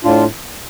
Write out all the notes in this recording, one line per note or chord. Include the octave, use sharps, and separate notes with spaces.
A2 D4 F4